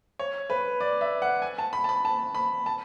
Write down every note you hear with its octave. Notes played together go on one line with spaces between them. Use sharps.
C#5
B4
D5
E5
F#5
G#5
A5
B5
A5
B5
A5
B5
A5